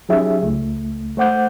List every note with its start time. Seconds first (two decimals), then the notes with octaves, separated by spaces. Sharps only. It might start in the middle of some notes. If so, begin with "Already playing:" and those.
0.09 F#3 C#4 D#4 G4 G#4 E5
0.43 C#2 A3
1.17 A3 C5 F#5 D6 G6